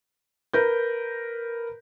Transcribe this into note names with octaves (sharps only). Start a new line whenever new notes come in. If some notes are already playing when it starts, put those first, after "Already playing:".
A#4 B4 G6